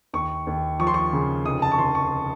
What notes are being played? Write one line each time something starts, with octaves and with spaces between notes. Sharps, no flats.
D#2 C#6
D#2
F3 C#6
C6
C#6
C#3
F1 D#6
A5
C#6
F1 C6
C#6